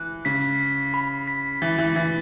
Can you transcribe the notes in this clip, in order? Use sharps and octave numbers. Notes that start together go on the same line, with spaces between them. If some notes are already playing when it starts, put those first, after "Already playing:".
Already playing: E3 F#6
C#3 B6
B6
B5
B6
E3 A6
E3
E3 A6